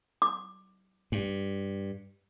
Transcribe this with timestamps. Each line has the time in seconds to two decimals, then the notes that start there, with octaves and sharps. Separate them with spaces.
0.22 D6
1.12 G2